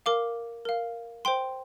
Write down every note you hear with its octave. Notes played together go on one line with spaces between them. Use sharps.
A#4 F5 D6
A#4 F5
C5 G5 C6